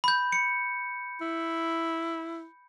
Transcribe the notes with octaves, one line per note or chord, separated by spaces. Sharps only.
B5 G6
C#7
E4